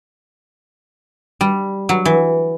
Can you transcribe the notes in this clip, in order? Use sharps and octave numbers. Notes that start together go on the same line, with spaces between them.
G3
F#3
E3